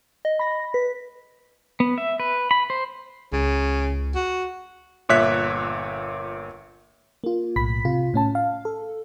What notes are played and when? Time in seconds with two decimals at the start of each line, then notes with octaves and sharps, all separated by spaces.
0.25 D#5
0.39 B5 A#6
0.74 B4 B6
1.80 B3
1.98 E5
2.20 B4
2.51 B5
2.70 C5
3.33 C#2 C#3
4.15 F#4
5.09 G1 A#2 C#5 E5 F#6 B6
7.24 A#3 F4
7.56 B1 A2 B5 B6
7.85 C3 F4
8.14 A2 C#4 A5
8.35 F5
8.65 A4